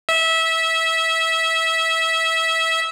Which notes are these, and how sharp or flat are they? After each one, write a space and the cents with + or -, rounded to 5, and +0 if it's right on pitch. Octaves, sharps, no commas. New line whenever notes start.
E5 -20